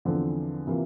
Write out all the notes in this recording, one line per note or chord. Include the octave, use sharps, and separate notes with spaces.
E2 D3 F3 C4
C3 E3 A#3 F4